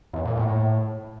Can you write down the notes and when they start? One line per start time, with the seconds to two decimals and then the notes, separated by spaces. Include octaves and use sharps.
0.13 E2
0.25 A#2
0.37 A2